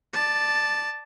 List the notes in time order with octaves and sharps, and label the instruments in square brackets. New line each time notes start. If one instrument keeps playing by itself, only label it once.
[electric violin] D5 A5